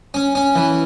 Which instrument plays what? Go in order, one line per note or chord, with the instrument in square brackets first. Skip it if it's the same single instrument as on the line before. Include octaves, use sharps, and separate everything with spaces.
[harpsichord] C#4
C#4
E3